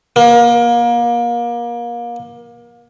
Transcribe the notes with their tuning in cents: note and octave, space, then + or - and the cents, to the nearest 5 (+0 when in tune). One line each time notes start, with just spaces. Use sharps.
A#3 +30